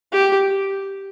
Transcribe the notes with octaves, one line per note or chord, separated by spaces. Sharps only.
G4